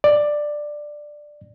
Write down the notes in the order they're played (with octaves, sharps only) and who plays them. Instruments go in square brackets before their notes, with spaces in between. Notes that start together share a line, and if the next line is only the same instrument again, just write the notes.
[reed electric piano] D5